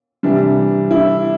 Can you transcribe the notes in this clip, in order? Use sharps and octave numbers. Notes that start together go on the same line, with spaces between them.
C3 E3 G3 D4
E4